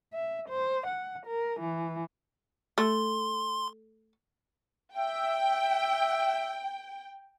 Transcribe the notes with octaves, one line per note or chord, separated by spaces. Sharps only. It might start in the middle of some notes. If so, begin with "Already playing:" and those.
E5
C5
F#5
A#4
E3
A3 C6
E5 G5